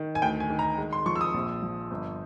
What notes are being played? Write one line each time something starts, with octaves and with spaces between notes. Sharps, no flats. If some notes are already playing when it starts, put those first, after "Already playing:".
Already playing: D#3
G#5
D2 G5
G#5
D#3
A#5
G#3
C6
F3 C#6
E6
D#6
A#1
F3
G1